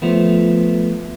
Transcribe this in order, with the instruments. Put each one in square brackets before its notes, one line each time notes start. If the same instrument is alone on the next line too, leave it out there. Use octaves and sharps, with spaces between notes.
[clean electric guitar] F3 A3 B3